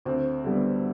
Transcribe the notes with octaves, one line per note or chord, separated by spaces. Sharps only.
D2 C4
D3 G3 B3